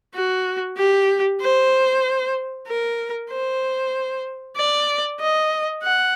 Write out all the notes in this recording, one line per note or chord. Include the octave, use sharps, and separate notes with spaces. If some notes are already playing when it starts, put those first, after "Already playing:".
F#4
G4
C5
A#4
C5
D5
D#5
F#5